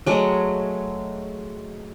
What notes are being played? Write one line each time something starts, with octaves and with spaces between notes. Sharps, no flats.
F#3 G#3 A3